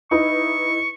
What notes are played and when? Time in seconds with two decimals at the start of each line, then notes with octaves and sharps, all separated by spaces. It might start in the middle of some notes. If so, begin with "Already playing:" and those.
0.11 D#4 E4 B4 C#6